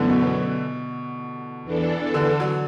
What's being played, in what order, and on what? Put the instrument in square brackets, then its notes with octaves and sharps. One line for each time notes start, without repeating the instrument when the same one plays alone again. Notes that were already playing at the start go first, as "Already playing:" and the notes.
Already playing: [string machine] F#2 F#3 B3 [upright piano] D3 E3 A3
[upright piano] B2
[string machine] E2 E3 D4 A4
[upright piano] D3
F#3